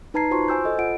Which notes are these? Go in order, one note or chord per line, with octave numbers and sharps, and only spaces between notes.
D#4 B4 A5 A#5 G#6 C7
F4 F#4 C5 C6 C#6
C5 G#5 E6 G6
A4 D#5
F4 F#5 D7